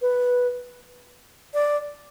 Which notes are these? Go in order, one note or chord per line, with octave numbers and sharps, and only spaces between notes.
B4
D5